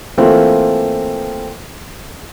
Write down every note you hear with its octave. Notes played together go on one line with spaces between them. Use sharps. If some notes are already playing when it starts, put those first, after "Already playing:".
E3 A3 A#3 C4 F4